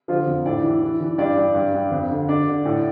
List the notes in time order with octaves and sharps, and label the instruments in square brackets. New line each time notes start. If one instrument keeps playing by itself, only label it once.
[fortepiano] D3 F3 F4
F2
A2 D4 D5
E3
E3
E3
G2 D4 D5
G2
G2
G2
F2
D3
D3 D4 D5
D3
A2